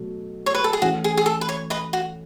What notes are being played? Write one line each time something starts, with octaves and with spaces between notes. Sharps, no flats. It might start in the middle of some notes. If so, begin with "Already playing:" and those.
Already playing: B2 F#3 A3
C#5
B4
A4
G#4
E3 A3 C#4 F#4
G#4
G#4
A4
B4
C#5
B4 D#5
F#4